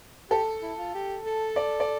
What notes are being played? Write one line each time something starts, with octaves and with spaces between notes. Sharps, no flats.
G4 A4
E4
F4
G4
A4
D5
D5